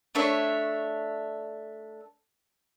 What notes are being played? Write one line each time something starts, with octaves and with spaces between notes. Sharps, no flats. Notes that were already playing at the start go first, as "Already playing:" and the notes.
A3 D4 C#5 E5